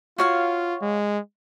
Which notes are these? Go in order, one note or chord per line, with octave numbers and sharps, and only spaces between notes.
F4 F#4 C#5 F5
G#3